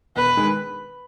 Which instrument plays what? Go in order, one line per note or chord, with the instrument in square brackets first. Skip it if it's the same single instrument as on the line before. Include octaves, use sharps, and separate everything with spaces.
[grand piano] E1 [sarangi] B4
[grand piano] D#3 G#3